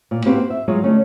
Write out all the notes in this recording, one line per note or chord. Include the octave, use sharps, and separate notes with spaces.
A#2
A#3 C4 F#4 G4 B4
C5
E5
F#3 G#3 F4 G#4 C#5
D3 A3 C#4 D#4